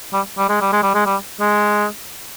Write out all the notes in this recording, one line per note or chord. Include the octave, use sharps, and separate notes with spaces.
G3
G3
G#3
G3
G#3
G3
G#3
G3
G#3